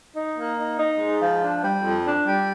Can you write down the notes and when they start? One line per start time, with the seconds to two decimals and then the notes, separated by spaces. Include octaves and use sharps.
0.15 D#4
0.36 A#3
0.57 D#4
0.78 D#4
0.99 G#2
1.20 F3
1.41 D4
1.62 G3
1.83 F2
2.04 D4
2.25 G3